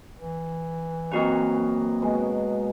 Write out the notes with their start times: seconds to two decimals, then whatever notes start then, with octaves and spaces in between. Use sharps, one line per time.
0.17 E3
1.12 F#2 A#3 C4 F#4 B4 D#5
2.02 B2 F#3 G#3